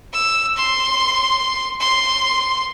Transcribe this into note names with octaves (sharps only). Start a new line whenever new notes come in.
E6
C6
C6